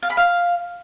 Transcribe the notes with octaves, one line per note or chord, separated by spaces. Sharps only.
F5
B5
F5